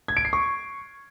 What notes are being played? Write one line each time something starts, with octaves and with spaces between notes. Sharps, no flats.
G#6
D7
C7
C#6